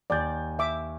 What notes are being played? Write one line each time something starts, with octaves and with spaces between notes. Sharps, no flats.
D#2 D5 G#5 G6
E5 D6